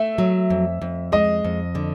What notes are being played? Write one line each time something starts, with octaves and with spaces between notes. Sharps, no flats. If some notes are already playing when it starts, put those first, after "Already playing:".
Already playing: A3 E5
F#3
F2
F2
G#3 D#5
F2
D3